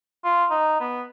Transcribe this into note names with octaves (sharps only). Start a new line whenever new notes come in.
F4
D#4
B3